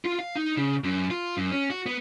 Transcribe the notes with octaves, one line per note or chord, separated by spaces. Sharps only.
F4
F5
D#4
C#3
F#2
F4
F#2
C#4
F#4
B3